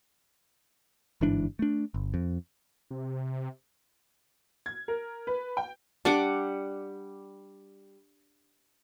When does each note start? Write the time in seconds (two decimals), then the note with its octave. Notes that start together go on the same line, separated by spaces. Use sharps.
1.21 G1 G#2 E3 D4
1.59 A3 D4
1.94 G1
2.14 F2
2.91 C3
4.66 G#6
4.88 A#4
5.27 B4
5.57 G5
6.05 G3 D4 F#5 D6